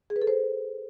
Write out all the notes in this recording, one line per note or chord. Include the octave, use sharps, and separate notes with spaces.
G#4
B4
A4
C5